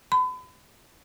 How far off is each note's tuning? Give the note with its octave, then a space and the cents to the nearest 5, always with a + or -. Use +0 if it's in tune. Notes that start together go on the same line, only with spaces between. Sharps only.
B5 +35